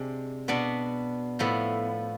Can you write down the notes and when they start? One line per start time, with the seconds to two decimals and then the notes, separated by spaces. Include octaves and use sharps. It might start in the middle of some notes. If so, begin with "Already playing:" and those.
Already playing: C3 G#3 D4
0.48 B2 B3 D4
1.39 A2 F3 B3 E4